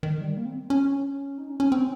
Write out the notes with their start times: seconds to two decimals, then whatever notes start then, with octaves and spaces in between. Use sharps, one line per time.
0.03 D#3
0.21 G3
0.37 A#3
0.45 C4
0.70 C#4
1.38 D#4
1.49 C#4
1.60 C#4
1.72 C4